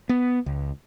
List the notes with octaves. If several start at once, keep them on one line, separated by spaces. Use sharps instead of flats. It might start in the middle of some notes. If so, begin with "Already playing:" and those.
B3
C#2